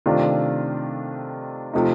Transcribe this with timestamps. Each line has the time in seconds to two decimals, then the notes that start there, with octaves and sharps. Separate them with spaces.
0.06 C3 D#3 A3 D4 F4
1.74 C3 F3 A3 D#4